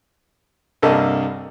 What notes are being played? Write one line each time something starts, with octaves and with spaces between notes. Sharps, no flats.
C2 G2 A#3 A4 D#5